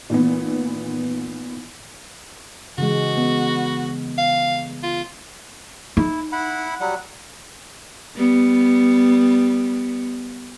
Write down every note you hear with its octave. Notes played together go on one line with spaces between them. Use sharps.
A#2 D#3 E3 B3
C#3 E3 G#3 F#4
B3
F5
F4
D#4 E4
E4 F#5 B5
F#3 G3 F#5
G3 B3